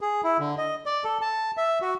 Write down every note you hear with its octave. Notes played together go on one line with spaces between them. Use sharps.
G#4
E4
D3
D#5
D5
A4
A5
E5
F#4